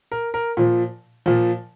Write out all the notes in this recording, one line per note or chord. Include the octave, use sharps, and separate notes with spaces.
A#4
A#4
A#2 F3
A#2 F3